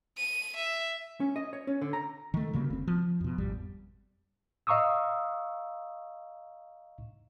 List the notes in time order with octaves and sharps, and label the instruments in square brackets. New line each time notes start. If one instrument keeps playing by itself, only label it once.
[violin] D#7
E5
[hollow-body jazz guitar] C#4
D#5
C#5
C#4
D3
A#5
[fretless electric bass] D#3 A3
D2 C#3 G3 A#3
F#1 C4
F3
F2 B2
G#1 F2 G3
[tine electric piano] D#5 F5 A#5 C#6 D#6 E6